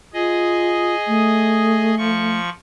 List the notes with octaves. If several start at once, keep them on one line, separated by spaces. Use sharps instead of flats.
F4 G#4 D#5
A3
F3 C#6